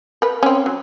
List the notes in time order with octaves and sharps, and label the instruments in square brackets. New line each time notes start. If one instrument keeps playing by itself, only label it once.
[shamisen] A#4 B4
C4 C#4
F#3